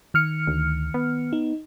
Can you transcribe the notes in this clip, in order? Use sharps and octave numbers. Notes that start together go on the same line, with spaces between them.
D#3 F6 C#7
D2
B3
D#4